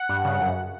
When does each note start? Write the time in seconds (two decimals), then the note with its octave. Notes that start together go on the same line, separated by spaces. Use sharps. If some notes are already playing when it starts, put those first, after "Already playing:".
Already playing: F#5
0.09 G2
0.25 C#3
0.41 F#2